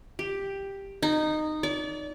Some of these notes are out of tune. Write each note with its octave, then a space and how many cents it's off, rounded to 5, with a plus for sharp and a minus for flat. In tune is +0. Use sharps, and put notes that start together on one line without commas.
G4 +5
D#4 -15
D5 -35